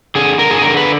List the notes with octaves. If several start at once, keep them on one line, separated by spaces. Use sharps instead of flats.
D3 G#4
D3 A#4
G#4
D3 A#4
B4